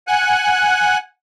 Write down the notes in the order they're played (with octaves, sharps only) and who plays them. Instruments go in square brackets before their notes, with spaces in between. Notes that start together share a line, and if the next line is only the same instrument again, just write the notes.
[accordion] F#5 G#5 F#6